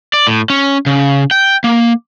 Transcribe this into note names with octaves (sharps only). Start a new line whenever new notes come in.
D5
A2
C#4
C#3
G5
A#3